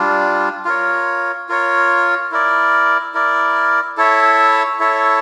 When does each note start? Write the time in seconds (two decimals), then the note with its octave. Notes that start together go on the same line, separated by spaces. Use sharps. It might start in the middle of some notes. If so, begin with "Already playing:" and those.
Already playing: G3 D4 F4
0.65 F4 A#4 C#5
1.49 F4 A#4 C#5
2.32 E4 A#4 D5
3.14 E4 A#4 D5
3.97 E4 A4 C#5 E5
4.80 E4 A4 C#5 E5